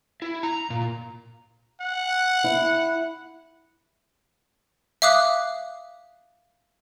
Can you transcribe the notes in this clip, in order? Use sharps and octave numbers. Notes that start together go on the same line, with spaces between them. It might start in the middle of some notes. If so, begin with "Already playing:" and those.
E4
A#5
A#2
F#5
E4
E5 F5 D6 D#6 F#6